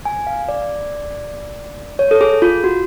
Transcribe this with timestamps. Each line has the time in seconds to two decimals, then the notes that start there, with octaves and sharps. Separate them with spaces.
0.05 G#5
0.27 F5
0.49 D5
1.99 C#5
2.11 A4
2.21 G#4
2.42 F4
2.64 F#4